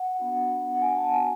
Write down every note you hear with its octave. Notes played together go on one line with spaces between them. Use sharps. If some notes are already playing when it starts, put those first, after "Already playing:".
Already playing: F#5
B3 D4 F#4
F#5
G#5
A5
B3 F#4 G#5